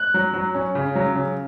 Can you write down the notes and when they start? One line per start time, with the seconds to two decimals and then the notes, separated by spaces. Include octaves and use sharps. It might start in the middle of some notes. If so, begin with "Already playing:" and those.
Already playing: F#6
0.14 F#3
0.34 F#3
0.55 C#4
0.75 C#3
0.95 F#3
1.15 C#3